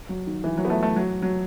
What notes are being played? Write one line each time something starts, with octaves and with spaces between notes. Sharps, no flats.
F#3
D#3
E3
F#3
B3
A3
A3
F#3
F#3